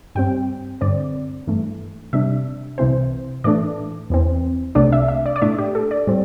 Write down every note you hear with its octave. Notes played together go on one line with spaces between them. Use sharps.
G2 G3 C4 G5
G2 D3 C4 D5
G2 E3 A3
C3 G3 D4 E5
C2 C3 E3 C4 C5
A2 E3 A3 D4 D5
E2 E3 C4
C2 C3 A3 D4 D5
E5
E5
D5
D5
A2 A3 D4 E5
G4
A4
D5
A2 G3 C4